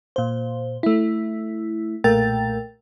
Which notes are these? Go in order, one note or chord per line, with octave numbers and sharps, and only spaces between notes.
A#2 C5
A3 E4
B1 A#2 A3 A#4 G5 A6